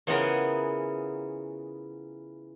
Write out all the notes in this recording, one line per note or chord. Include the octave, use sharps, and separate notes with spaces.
C#3 E3 B3 F4 G#4 A#4